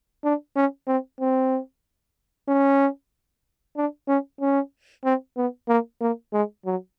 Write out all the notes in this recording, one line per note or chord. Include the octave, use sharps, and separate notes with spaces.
D4
C#4
C4
C4
C#4
D4
C#4
C#4
C4
B3
A#3
A#3
G#3
F#3